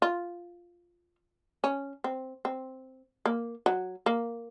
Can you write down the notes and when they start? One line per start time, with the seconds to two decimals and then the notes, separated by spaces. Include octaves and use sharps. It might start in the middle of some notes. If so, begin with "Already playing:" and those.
0.02 F4
1.64 C#4
2.04 C4
2.45 C4
3.26 A#3
3.66 F#3
4.06 A#3